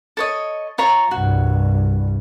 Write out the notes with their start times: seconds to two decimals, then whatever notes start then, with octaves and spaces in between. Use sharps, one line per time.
0.17 A4 C#5 D#5
0.78 F4 C#5 A#5
1.11 C2 G2 F#4